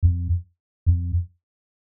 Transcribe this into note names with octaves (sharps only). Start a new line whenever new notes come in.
F2
F2